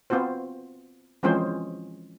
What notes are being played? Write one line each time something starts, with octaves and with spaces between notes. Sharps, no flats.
B3 C4 F4 F#4 C5
E3 F3 G#3 C4 C#4 C5